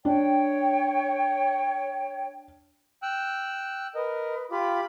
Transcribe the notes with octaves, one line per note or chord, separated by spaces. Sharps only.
D4 C#5 G5
G5 E6 F#6
A#4 B4 D#5
F4 G4 B5 D6